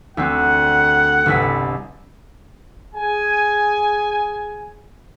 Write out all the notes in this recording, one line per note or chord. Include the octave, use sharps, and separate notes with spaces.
D2 C4 F#5
G1 C2 B6
G#4 G#5